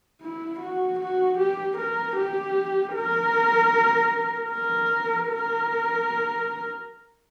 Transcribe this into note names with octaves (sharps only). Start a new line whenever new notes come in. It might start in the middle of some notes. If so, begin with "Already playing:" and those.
E4
F#4
F#4
G4
A#4
G4
A#4
A#4
A#4